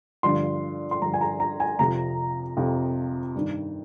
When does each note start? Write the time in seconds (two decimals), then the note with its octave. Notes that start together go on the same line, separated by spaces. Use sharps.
0.23 G2 D3 F3 C6
0.91 C6
1.01 G2 D3 F3 A#5
1.14 G#5
1.21 A#5
1.40 A#5
1.60 G#5
1.79 F2 C3 F3 A#5
2.57 F2 C3 F3
3.35 G2 D#3